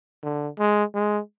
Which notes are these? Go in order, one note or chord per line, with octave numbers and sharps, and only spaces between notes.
D3
G#3
G#3